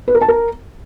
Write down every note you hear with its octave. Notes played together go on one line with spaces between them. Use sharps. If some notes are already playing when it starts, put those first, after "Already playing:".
B4
A#4
A5
A#4